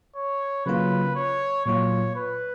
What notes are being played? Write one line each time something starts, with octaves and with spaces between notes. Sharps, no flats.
C#5
C#3 F#3 A#3 F4 B4
C#5
A#2 F#3 A#3 F4 C#5
B4